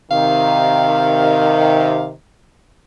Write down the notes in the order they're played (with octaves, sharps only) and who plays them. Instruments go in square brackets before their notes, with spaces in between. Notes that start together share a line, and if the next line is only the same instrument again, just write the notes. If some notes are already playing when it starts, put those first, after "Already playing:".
[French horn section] C3 D#3 [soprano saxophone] F5